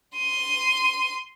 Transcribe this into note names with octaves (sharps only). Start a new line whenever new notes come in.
C6 D#7